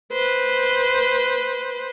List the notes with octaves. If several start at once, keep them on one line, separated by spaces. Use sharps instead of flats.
B4 C5